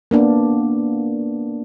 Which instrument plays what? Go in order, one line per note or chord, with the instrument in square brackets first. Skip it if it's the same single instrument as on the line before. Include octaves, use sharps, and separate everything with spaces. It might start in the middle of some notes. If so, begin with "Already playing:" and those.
[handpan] A#3 B3 D4